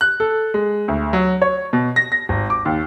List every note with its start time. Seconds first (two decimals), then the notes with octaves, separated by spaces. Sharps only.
0.01 F#6
0.20 A4
0.54 G#3
0.88 D2
1.13 F#3
1.42 C#5
1.73 B2
1.96 A#6
2.12 A#6
2.29 G#1
2.50 D6
2.65 D#2